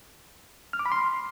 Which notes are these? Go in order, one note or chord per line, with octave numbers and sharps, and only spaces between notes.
F6
D6
B5
C6